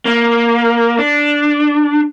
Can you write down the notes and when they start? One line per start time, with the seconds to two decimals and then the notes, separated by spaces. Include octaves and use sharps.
0.05 A#3
0.99 D4